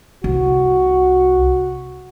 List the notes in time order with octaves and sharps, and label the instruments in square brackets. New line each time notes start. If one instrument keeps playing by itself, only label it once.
[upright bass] C2 [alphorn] F#4